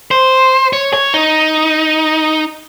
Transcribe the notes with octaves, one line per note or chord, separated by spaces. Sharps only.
C5
C#5
C#5
D#4